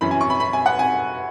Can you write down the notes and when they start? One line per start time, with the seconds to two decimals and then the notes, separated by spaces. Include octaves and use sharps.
0.01 F#2 E3 C#4 B5
0.11 G#5
0.21 C#6
0.30 B5
0.40 B5
0.53 G#5
0.66 F#5
0.79 G#5